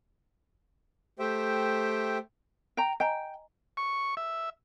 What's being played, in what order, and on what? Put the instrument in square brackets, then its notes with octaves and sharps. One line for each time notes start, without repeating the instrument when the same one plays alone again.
[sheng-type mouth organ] A3 G4 C5 E5 G5
[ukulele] G5 A#5
[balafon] D#5 G#5 A#5 [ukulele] G5
[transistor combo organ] C#6
E5